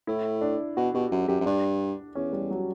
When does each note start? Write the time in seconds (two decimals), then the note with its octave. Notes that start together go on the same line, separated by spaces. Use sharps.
0.07 A2 E4
0.41 D4
0.77 B2 F#4
0.94 B2 G4
1.11 F#2 F#4
1.28 F#2 G4
1.41 F#2
1.46 G2 D4
2.15 E2 C#4
2.33 G3
2.50 F#3